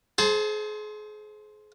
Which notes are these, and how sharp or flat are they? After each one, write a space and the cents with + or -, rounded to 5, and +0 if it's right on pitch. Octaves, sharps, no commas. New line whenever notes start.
G#4 +35 C5 +0 A5 +0